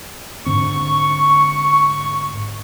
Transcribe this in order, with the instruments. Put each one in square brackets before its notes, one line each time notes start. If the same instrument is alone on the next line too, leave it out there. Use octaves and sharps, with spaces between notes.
[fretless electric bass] G#2 D3 C4 [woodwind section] C#6